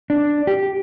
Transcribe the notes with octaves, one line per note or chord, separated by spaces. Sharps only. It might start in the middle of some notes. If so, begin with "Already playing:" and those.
D4
G4